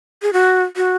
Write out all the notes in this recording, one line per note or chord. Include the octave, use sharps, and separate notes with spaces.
G#4
F#4
F#4